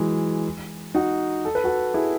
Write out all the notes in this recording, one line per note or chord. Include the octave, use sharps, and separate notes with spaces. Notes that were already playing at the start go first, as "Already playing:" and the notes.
Already playing: E3 F#3 G#3
D#4 F#4
A4
B4
F#4 A4
E4 G#4